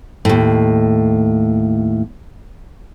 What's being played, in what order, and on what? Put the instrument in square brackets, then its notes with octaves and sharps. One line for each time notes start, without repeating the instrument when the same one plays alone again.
[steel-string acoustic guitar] D#2 A2